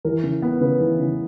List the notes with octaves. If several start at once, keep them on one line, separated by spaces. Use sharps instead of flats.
E3 A#4
C#3
B3
C#3 B4
E3
C#3